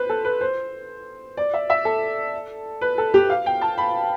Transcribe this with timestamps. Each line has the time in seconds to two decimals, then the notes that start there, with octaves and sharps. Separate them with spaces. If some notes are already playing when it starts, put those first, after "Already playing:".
Already playing: B4 C5
0.09 A4
0.25 B4
0.41 C5
1.37 D5
1.54 E5
1.70 E5
1.85 A4
2.81 B4
2.98 A4
3.14 G4
3.30 F5
3.46 G5
3.61 A5
3.78 B5